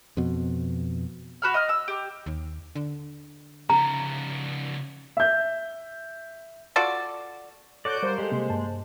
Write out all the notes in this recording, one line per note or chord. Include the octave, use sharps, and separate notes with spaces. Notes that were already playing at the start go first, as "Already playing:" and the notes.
F2 B2
F#4 B5 F6
D#5 F6
E6
G4
D#2
D3
C#3 F3 A#5
E5 G6
F4 F#4 A4 D5
F#4 A4 C#5 D5 F#6 G6 D7
G3 A#4 C5 F5
G#3 G4 A4
C3 A#3 G4
G2 A5